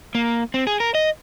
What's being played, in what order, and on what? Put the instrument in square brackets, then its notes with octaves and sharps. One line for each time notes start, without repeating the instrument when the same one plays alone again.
[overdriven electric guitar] A#3
C4
G#4
A#4
D#5